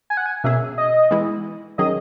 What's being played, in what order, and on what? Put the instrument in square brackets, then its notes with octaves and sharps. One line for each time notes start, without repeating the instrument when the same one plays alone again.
[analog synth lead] G#5
F#5
G#5
[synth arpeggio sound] B2 A#3 C#4 G#4 [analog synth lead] E5
[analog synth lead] D#5
[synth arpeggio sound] E3 G#3 B3 E4
[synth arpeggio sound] D#3 F#3 C#4 G#4 [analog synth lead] D#5